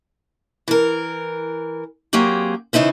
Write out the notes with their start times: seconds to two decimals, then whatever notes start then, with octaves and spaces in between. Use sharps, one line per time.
0.68 E3 A#4
2.13 F#3 A#3 C4 G4 G#4
2.73 C#3 E3 D#4 E4 C5